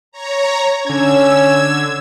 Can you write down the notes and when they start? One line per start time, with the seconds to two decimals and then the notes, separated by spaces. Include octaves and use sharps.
0.12 C#5 A#5
0.87 D3 C#4 E6 G#6